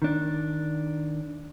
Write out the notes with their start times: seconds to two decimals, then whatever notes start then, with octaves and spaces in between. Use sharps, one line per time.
0.02 D#3 D4